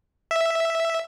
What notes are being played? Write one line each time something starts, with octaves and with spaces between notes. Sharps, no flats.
E5